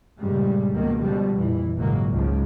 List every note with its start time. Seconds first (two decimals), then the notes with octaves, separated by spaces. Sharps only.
0.19 G2 A#2 C#3 G3 G#3
0.71 C#2 B2 D#3 A#3
1.01 B2 D3 F3 G3
1.33 F2 A#2 E3
1.76 G#1 A#2 C#3 F#3 G#3 A#3
2.10 C#2 G#2 C#3 F3